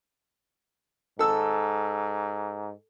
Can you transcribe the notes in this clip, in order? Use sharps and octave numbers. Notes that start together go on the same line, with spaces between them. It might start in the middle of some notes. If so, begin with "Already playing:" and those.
G#2 A4 E6